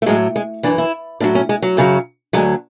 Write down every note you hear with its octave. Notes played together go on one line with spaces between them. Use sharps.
A3
A2 F#3 G#3
G#3
F#2 E3 D4
E4
A2 F#3 D4
C#4
G#3
F#3
F#2 C#3 F#3
D2 D3 F#3 G#3